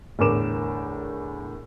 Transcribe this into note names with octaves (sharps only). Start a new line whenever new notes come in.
E2 A2 D3 A#4 D6 E7